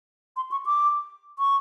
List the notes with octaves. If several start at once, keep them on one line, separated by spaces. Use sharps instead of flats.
C6
C#6
D6
C#6